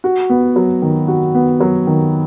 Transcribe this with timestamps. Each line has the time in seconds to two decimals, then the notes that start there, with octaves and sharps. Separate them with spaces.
0.04 F#4
0.30 B3
0.56 F#3
0.82 D#3
1.08 F#4
1.35 B3
1.60 F#3
1.87 D#3